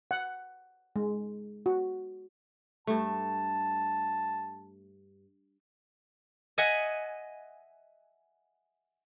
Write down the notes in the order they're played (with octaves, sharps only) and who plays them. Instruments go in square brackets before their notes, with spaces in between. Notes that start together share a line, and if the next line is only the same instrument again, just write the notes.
[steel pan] F#5
G#3
F#4
[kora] G2 A3 [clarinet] A5
[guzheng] D#5 E5 F#5 G#5